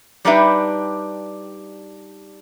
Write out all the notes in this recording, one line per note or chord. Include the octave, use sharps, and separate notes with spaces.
G3 D4 D#4 G4 B4 E5